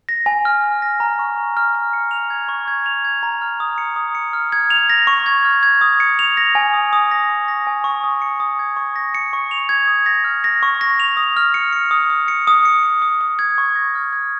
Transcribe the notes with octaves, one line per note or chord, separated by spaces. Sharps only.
A#6
G#5
F6
F6
A#6
A#5
C#6
A#5
F6
F6
C#7
F7
G#6
C#6
G#6
F7
G#6
A#5
F6
D#6
C#7
D#6
C#7
F6
G#6
F7
A#6
C#6
G#6
F6
G#6
D#6
C#7
F7
A#6
G#5
D#6
D#6
A#6
C#6
A#6
G#5
C#6
D#6
C#7
D#6
G#6
C#6
A#6
C#7
C#6
F7
G#6
D#6
A#6
F6
A#6
C#6
A#6
F7
D#6
F6
C#7
C#7
D#6
D#6
C#7
D#6
C#7
C#7
D#6
D#6
G#6
C#6
A#6
F6
G#6